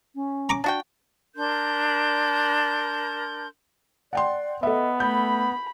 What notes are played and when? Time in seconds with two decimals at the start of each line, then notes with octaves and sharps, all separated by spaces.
0.15 C#4
0.49 A#5 C#6 D6
0.64 D4 F#4 G5
1.35 D4 A#4 C6 G6
4.13 D5 F#5 G5 C6
4.63 B3 A4 D#5 E5
5.00 A3 B5 G6